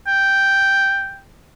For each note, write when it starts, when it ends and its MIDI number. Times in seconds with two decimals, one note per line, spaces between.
0.07 1.20 79